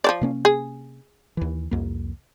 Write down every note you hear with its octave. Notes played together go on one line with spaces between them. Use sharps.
F3 C5 D5
C3 A#3 C#4
G#4
D#2 E3
C2 F2 A#3